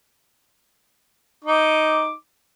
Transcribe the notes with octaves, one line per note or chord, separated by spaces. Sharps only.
D#4 D6